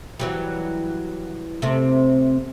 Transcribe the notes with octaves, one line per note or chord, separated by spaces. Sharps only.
E3 F#3 G3
C3 A3